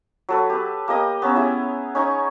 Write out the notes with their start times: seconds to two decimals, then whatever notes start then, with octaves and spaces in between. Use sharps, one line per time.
0.29 F#3 A4 B4
0.50 G4 B4
0.88 A#3 G4 D#5 D#6
1.22 B3 C#4 A#5 E6
1.35 E4 G#4 G#5
1.95 C#4 D#4 G#5 C#6